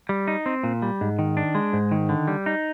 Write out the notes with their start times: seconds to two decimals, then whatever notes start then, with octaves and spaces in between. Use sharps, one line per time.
0.09 G3
0.28 D#4
0.46 C4
0.64 A#2
0.82 G3
1.01 G#2
1.19 D#3
1.37 D4
1.55 G#3
1.73 G#2
1.92 D#3
2.09 D3
2.28 G3
2.46 D#4